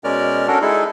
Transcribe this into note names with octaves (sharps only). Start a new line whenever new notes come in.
B2 G#3 C#4 A#4 D5 F6
C#4 D4 F#4 A4 A#4
G#3 D#4 E4 G#4 A4